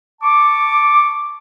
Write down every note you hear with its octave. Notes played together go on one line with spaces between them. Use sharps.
A5 C#6 D6